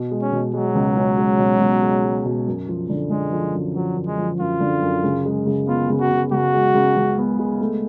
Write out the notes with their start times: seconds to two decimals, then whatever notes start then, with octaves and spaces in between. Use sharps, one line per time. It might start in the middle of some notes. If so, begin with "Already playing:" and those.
Already playing: B2
0.11 G#3
0.22 C#4
0.32 B2
0.54 F#3 G#3
0.75 C#2
0.96 C#4
1.18 G#3
1.39 B2
1.60 B2
1.83 G#3
2.04 G#3
2.25 B2
2.47 F#2
2.68 F3
2.89 D3
3.10 D3 G#3
3.32 F3
3.54 F#2
3.74 F3 F#3
3.96 F#2
4.07 G#3
4.18 F3
4.40 F#2 F4
4.60 D3
4.82 F#2
5.04 C#3
5.25 G#3
5.46 C#3
5.67 B3 F4
5.90 C#3
6.00 F#4
6.11 C#3
6.31 C#3 F#4
6.54 G#3
6.75 C#3
6.97 C#2
7.18 B3
7.39 G#3
7.61 A3